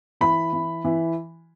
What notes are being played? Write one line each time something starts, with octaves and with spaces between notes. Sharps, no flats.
E3 B5
E3
E3